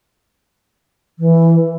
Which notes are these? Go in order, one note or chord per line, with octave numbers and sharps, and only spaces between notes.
E3